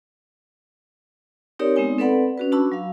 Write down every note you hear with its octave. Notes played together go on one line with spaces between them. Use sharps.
C4 D#4 G4 A#4 C#5 D5
G#3 B3 C4 D#4 G#5
C4 A4 B4 D5 F#5 B5
C#4 F#4 B4
D4 F#4 A5 B5 C#6 E6
F#3 F5